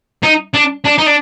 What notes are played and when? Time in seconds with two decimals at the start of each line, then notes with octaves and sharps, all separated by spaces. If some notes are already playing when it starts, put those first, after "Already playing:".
0.23 D#4
0.54 D4
0.85 D4
0.98 D#4
1.06 D4